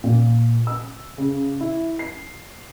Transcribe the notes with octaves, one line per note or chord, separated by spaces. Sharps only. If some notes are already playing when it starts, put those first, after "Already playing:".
A#2
E6
C#3
E4
C7